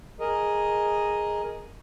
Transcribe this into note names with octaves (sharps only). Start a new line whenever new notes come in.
G#4 A#4 D#5